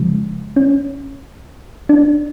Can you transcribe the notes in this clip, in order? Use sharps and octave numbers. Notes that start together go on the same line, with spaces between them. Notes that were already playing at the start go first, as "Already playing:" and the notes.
Already playing: C#3 F3 G#3
C#4
D4